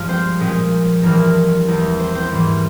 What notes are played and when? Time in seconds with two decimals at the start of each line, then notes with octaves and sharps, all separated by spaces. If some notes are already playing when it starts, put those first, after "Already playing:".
Already playing: G2 F3 G#3 F4
0.08 C4 C5
0.40 A#2 F3 G#3 C4
1.02 G2 E3 G#3 A#3 C4 A#4
1.67 E2 E3 G#3
1.99 C4 C5
2.15 C4 C5
2.31 G#2 E3 G3 A#3